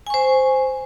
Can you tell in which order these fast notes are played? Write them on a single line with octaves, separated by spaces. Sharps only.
G#5 C#6 C5